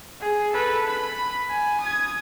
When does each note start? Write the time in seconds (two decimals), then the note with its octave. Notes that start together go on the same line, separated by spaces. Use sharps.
0.21 G#4
0.52 A4 B4
0.88 B5
1.50 G#5
1.80 D#6 G#6